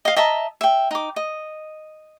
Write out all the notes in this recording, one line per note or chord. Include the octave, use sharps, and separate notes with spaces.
D#5 F5
D#5 E5 A5 A#5
E5 G5
D#4 D6
D#5